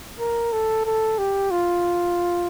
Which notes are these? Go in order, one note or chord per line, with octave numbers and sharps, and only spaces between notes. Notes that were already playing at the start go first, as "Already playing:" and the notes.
A#4
A4
A4
G4
F4